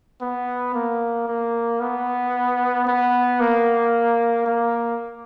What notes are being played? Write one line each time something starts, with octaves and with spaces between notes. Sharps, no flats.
B3
A#3
A#3
B3
B3
A#3
A#3